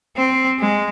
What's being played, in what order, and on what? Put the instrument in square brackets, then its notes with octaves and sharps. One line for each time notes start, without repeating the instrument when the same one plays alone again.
[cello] C4
G#3